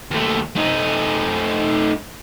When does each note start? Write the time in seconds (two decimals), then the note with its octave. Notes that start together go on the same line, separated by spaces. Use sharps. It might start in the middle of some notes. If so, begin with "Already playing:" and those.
0.11 D#2 A3
0.55 A3 D#4